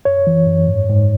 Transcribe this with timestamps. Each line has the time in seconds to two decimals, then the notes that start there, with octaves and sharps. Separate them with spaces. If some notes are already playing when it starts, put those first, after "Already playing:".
0.05 F#2 C#5
0.27 E3
0.47 F#2
0.67 G#2
0.89 G#2